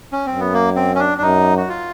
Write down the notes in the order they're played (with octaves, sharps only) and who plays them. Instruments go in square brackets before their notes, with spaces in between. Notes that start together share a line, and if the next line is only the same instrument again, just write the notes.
[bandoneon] C#4
[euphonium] F#2 [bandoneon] C4
[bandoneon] B3
A#3
C4
C#4
D4
D4
[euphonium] F#2 [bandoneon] D#4
[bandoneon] F#4
F4